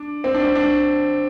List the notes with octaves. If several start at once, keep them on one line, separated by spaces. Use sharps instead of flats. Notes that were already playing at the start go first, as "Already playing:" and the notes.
Already playing: D4
C4
D4
C4
D4